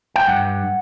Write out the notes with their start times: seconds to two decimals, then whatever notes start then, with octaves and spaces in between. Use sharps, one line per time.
0.16 G5
0.27 G2 F#5